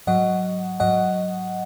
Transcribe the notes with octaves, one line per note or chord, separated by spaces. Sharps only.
G#2 F#3 D#5 F#5
G#2 F#3 D#5 F#5